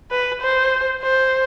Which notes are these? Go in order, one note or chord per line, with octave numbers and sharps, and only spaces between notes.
B4
C5
C5